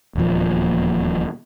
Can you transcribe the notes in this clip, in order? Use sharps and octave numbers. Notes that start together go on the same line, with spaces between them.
D#1 E2 A#2 F3